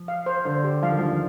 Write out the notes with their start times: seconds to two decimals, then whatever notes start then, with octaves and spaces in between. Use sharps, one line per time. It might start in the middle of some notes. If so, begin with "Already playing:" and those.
Already playing: F3
0.08 F5
0.26 C5
0.45 D3 C5
0.64 G4
0.83 F3 F5
0.90 D#3
0.98 F3 D4